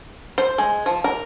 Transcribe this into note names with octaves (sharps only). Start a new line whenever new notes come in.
C5
G#3
F3
A#4